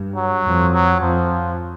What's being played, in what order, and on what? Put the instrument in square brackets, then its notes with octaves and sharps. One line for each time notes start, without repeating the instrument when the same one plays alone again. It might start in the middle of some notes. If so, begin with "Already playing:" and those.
Already playing: [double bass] G2
[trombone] F#3
[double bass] F2
[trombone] F#3
[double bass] F2 [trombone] F3